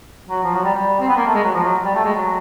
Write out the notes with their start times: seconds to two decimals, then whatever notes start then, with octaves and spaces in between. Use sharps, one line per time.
0.29 F#3
0.43 F3
0.54 F#3
0.64 G3
0.74 G3
1.00 C4
1.08 B3
1.16 A#3
1.26 A3
1.35 G#3
1.44 F#3
1.54 F3
1.64 F#3
1.84 G3
1.95 A3
2.04 G#3
2.15 F#3